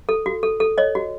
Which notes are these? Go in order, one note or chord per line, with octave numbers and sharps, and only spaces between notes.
A4
F#4
A4
A4
C#5 D#5
F#4